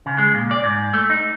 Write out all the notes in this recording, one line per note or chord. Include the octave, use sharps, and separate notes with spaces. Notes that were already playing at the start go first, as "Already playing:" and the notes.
C#3
G#3
A#2
D5
G#2
A3
D#4